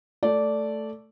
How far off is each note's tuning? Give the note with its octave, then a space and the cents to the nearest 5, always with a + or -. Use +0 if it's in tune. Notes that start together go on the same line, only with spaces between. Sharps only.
A3 +0 D5 -10